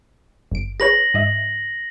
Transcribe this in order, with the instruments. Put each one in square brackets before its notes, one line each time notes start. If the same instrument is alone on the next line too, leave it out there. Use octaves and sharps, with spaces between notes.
[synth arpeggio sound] G1 D7
[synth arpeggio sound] G#4 B4 C#5 [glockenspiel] A#6 F#7
[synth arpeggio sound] G#2 D#5 E5